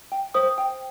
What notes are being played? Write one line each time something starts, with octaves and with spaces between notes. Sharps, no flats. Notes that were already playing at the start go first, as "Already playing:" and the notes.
G5
C5 D#6
G5